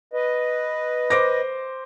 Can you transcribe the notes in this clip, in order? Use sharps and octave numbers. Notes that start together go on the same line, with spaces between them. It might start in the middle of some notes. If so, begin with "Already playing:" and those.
B4 D#5
C5 D6 A#6